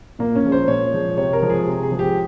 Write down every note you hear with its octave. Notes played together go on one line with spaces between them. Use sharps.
A#2 A#3
C#4
F3 G#3
C5
A#2 C#5
F3 G#3
C3 C#5
A#4
F3 G#3
G#4
C3
G#4
F3 G#3
G4